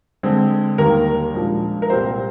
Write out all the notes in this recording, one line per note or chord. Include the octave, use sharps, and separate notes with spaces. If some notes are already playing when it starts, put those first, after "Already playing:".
D3 G#3 C4
D#2 D#3 G3 A#3 A#4
A#2 F3 G#3 D4
A#4
C2 A#2 G3 C4 F4 C5